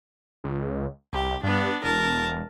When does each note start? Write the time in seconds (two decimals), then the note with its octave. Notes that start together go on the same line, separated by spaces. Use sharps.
0.44 C#2
1.13 C2 G4
1.43 G2 B3 D4
1.83 E1 A#4 A5